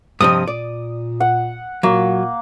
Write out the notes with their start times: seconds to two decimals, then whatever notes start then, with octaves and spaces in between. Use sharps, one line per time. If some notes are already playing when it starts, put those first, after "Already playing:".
0.20 G2 C3 F3 D#5 D#6
0.48 A#2 D5
1.20 F#5
1.83 A#2 F#3 A#3